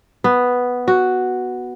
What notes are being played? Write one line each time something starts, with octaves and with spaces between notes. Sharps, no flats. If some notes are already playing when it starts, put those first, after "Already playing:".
B3
F#4